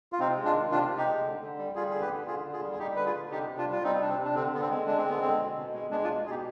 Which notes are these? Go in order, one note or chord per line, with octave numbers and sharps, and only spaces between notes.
F4
C3 C4 D#4
G#3
D4 F4
D#3
C3 D4 F4
C3
D#4 G4
G#3
D3
D3
G3
G3 F4 G#4
D3 G#4
G4 B4
D3
D3 F4 G#4
D3
F4 G#4
G3
G#4
G3 D#4 G4
D3 B4
F4 G#4
D3
C3 D#4 G4
C3
D4 F4
G3
F4
G3 C4 D#4
C3 D4
C4
C3
D4
D3 C4
D3 B3
C4
G#3
G#3 D4
C4
D3 B3
D3 C4
B2
B2
G#3
G#3 B3 D4
D4 F4
B2
B2 D#4 G4 G#4